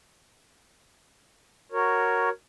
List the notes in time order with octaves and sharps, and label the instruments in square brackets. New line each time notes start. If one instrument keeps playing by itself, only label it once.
[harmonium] F#4 A#4 C#5